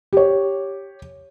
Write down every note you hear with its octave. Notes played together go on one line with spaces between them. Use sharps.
G4 C#5